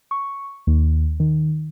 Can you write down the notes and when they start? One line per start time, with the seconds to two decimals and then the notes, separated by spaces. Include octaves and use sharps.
0.11 C#6
0.67 D#2
1.20 D#3